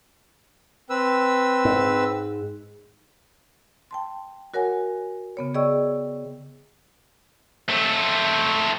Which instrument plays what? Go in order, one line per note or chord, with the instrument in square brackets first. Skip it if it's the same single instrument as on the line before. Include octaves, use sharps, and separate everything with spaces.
[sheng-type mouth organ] C4 B4 E6
[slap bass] G#2
[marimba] G5 A5 C6
F#4 A#4 C#5 F#5 G#5
C#3 B3 C#5
G#4 D5 D#5 G5 C#6 E6
[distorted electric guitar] A3 C4